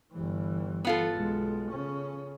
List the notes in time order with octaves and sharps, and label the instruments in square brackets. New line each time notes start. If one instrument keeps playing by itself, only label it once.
[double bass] G1 E3
[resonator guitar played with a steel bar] B3 F4 A4
[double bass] B1 G#3
C#3 C#4